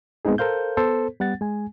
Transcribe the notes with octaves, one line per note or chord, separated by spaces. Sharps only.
G#3 B3 C4 D#4 G#4
A4 A#4 C5 F5 G6
B3 A4 C5
G3 B3 F#5 A6
G#3 G#5